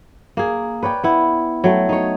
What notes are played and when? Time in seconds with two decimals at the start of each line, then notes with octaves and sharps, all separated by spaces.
0.37 A#3 G#4
0.83 B4 C#5 D5 G5
1.04 B3 E4
1.64 F#3 A3 G5
1.89 D#4 C#5